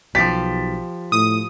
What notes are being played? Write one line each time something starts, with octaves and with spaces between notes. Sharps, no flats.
B1 F3 G4 A6 B6
A2 D#6